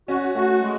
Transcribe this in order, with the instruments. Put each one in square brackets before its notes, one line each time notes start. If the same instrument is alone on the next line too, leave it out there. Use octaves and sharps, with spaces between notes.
[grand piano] C#4 [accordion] F#4
[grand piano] A3 [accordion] F#4
[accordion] G#3